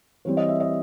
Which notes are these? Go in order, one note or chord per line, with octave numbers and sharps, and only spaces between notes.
E3 G3 C4 C#5
D#5
E5
D#5